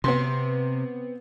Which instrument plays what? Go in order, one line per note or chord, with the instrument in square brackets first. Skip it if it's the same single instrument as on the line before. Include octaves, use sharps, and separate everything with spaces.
[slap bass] C3 [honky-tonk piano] B3 C4 C6